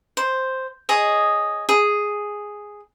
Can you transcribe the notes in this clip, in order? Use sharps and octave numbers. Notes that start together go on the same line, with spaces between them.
C5
G#4 C#5 D#5
G#4